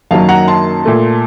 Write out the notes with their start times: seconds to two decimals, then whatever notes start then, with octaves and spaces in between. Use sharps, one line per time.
0.11 F#2 D#3 F#3 A#3 F5 A5
0.29 F#5 A#5
0.48 A5 C6
0.85 A#2 A3